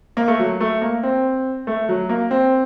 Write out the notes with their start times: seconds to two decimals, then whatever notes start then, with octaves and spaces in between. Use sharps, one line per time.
0.17 A#3
0.28 A3
0.39 F#3
0.60 A3
0.82 A#3
1.03 C4
1.67 A3
1.89 F#3
2.09 A#3
2.31 C4